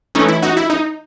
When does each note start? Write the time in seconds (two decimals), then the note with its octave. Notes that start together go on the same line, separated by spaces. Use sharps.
0.15 E3 A3 C#4 D#4
0.28 E4
0.42 D#4 F#4
0.57 E4
0.70 D#4